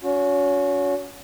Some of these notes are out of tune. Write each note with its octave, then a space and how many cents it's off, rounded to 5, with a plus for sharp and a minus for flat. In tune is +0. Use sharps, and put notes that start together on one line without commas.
C#4 +30 F#4 -25